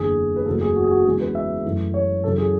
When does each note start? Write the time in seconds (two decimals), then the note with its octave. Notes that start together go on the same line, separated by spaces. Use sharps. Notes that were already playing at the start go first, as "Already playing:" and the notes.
Already playing: F#1 E2 D3 G#4
0.36 B4
0.46 F#1 E2 C#3 F#3 A3 A4
0.61 G#4
0.76 F#4
0.84 G#4
0.91 F#4
1.05 E2 C#3 G#3 B3 G#4
1.20 B4
1.35 E5
1.65 F#2 E3 A3
1.94 C#5
2.24 F#2 C#3 E3 A4
2.38 G#4